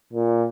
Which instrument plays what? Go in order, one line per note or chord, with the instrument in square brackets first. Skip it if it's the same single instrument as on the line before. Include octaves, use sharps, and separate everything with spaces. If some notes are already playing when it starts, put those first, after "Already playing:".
[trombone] A#2